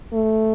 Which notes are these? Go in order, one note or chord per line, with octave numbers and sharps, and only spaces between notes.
A3